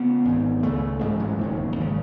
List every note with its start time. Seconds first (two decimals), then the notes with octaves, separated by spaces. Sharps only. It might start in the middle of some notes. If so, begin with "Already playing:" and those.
Already playing: C#3 B3
0.25 G#1 G#2
0.63 C#2 C#3 A3
1.00 A1 G#2 G#3
1.19 F#3
1.38 E1 D#2 C#3
1.76 G#1 C#3